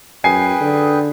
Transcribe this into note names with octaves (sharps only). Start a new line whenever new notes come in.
F#2 G#4 B4 G5 G#5 C7
D3